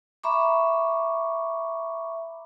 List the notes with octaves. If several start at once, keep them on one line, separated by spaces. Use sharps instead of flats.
E5 A#5 B5 C#6 D6